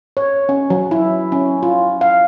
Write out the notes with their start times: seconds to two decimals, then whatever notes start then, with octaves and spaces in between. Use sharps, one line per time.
0.17 C#5
0.49 C#4
0.70 F#3
0.91 E4
1.32 C#4
1.63 F4
2.01 F5